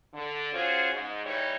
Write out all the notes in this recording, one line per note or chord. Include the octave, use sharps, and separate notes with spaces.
D3
C#4 F4 F#4 G#4 C5
G#2
E3 G3 D#4 C#5